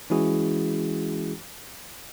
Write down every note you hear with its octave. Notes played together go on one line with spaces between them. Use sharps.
E3 G#3 C#4 E4 F#4 G#4